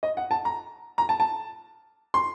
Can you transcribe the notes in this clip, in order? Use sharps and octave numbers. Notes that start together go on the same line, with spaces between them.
D#5
F#5
A5
A#5
A#5
A5
A5
C6